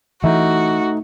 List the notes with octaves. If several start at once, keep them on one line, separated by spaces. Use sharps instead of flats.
E3 A3 D#4 F#4 E5